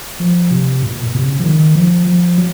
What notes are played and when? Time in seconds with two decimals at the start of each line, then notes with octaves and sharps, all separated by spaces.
0.20 F3
0.51 C3
0.82 A#2
1.03 A#2
1.15 C3
1.23 C#3
1.39 F3
1.44 D#3
1.75 F3
2.07 F3
2.38 F#3